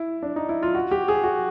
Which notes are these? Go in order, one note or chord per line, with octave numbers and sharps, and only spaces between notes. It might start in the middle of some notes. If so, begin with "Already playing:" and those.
Already playing: E4
D4
D#4
E4
F4
F#4
G4
G#4
F#4